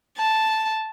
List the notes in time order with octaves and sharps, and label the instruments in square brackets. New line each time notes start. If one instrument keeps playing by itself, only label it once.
[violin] A5